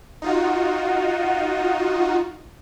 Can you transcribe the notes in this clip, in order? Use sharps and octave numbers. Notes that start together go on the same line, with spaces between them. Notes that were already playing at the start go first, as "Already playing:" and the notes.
D#4 F4 F#4